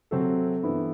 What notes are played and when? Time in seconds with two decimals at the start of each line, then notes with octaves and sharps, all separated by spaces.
0.11 C3 F#3 C4 A4
0.63 G2 E3 B3 E4